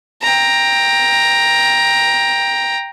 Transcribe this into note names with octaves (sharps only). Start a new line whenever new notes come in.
G5 A#5